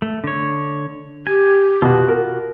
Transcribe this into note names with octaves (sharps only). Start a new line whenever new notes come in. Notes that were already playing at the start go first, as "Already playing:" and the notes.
A3
D3 C#5
G4 G#5
B2 F4 F#4
A#4